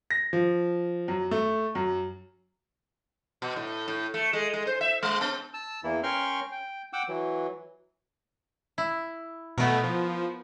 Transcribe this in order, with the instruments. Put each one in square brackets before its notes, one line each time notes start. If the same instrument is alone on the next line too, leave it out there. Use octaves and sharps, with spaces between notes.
[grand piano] A#6
F3
F#2
A3
F#2
[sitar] B2
A2
A2
A3
G#3
G#3
C5
E5
G#3
B3
[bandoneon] A5 E6
E2 E3 A#3 E4
C#4 A#4 G5 C6 C#6 F6
G5
F#5 G5 D6 E6
E3 F#3
[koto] E4
[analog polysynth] B2 A3 [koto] B3 A#4
[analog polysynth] F3